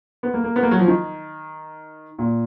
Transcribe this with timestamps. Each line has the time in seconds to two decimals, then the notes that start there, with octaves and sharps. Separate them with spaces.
0.23 B3
0.34 A#3
0.44 A#3
0.56 B3
0.63 A#3
0.71 F#3
0.79 F3
0.88 D#3
2.19 A#2